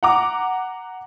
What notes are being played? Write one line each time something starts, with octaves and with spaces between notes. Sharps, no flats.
F#5 A#5 D6